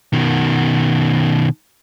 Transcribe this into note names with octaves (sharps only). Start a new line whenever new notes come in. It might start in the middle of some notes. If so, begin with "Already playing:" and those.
B2 D#3